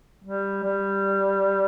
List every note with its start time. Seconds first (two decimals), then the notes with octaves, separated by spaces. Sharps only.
0.24 G3
0.63 G3